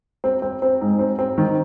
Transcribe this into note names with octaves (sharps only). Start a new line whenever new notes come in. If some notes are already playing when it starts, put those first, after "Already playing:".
C4
C4
C4
G#2
C4
C4
D#3